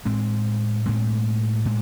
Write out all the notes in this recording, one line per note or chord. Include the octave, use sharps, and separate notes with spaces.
A2 G#3 C4
A2 G#3 C4
A2 G#3